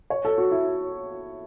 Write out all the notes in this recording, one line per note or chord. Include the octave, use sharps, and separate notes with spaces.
C#5
A4
F#4
E4